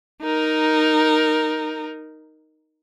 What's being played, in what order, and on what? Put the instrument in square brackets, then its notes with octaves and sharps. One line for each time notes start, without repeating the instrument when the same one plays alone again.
[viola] D#4 A#4